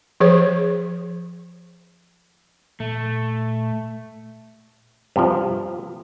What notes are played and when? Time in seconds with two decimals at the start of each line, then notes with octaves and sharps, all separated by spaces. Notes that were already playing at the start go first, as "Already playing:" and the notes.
0.20 F3 G#4 C5 C#5
2.80 A#2 A3
5.16 G2 C3 F3